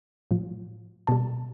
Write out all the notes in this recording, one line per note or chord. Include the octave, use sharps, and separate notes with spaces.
A2 F3
B2 G3 A5